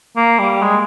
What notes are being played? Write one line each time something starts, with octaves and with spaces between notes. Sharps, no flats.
A#3
G3
G#3